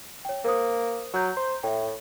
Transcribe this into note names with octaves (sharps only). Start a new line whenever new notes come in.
C#5 G5
A#3 A#4 C5 D#6
F#3 A#5 G6
C5
A2 E5 G5